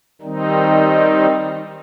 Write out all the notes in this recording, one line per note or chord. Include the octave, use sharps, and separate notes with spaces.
D#3 G3 C4 D#4